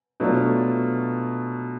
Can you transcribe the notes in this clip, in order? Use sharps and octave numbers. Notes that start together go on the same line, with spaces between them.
B2 F#3 A3 D4 F4